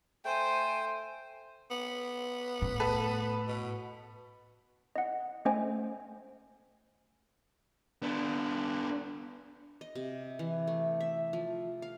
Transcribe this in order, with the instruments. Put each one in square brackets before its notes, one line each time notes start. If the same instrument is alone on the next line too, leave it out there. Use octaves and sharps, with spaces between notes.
[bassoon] A3 [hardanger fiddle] C5 [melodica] G5 [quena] G#5
[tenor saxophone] B3
[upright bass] A2
[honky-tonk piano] A4 B4
[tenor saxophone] B2
[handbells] D#5 F#5
A3 C#4 C5 D#5 G5 G#5
[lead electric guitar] B3 D4
[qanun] D#5
C3
E3
A3
E5
F3
F5